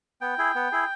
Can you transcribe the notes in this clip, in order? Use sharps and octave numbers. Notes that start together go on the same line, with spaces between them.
B3 G5
E4 G#4
B3
E4 G#4